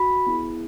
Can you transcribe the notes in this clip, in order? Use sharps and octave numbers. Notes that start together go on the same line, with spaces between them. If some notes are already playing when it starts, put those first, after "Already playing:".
Already playing: F#4 B5
B3 E4 G#4